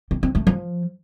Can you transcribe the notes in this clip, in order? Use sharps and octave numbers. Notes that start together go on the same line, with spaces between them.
C4
C4
A3
F3